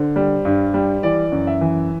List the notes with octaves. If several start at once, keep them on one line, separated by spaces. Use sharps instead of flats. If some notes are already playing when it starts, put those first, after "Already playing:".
Already playing: D3 C5
G3
G2
G3
E3 D5
F#2
E5
E3